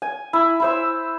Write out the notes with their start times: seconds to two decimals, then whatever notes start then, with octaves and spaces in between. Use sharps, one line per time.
0.02 G#5
0.33 E4
0.60 E4 C5 E6